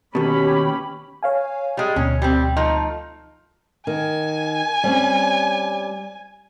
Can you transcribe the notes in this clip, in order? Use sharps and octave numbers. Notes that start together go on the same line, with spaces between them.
D#2 B2 C#4 G4 B5
C#5 F5 G#5
G3 G#3
D2 B2 C#4
G3 C4
F3 A3 D#4
D#3 G#5
G3 C4 C#4